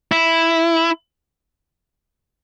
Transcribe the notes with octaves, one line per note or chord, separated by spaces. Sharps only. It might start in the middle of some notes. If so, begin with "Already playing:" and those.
E4